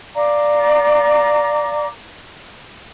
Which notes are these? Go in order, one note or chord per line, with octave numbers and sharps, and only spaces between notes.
D5 F5 A#5 D6